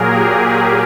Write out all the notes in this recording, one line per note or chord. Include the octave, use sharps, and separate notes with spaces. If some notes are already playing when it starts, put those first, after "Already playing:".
Already playing: A#2 F#3 A#3 G#4 A#4
G4